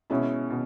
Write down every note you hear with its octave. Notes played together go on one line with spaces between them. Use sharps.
B2 G#3 C#4 E4
B2